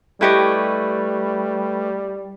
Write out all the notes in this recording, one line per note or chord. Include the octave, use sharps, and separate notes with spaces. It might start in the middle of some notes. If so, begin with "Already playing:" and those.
G3 A3 E4 G4 B4 D#5 C#6